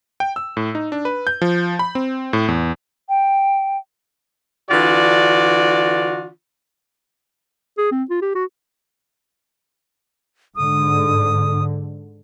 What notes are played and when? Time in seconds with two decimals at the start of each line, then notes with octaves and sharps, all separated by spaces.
0.20 G5
0.36 E6
0.57 A2
0.75 D#4
0.92 D4
1.05 B4
1.27 G6
1.42 F3
1.79 B5
1.95 C4
2.33 A2
2.48 E2
3.09 G5
4.70 D3 E3 D4 F4 F#4 D5
7.78 G#4
7.91 C4
8.10 F4
8.22 G4
8.35 F#4
10.56 G#2 D3 D#6